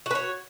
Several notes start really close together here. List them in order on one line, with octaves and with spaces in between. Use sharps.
F#4 B4 C#5